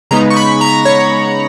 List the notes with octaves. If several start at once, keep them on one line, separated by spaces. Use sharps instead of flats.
C#3 G#3 B3 D#4 A#5
C#6
B5
A#5
C#5